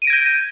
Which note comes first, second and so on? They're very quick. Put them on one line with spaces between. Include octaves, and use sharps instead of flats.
D#7 D7 A#6 G#6 G6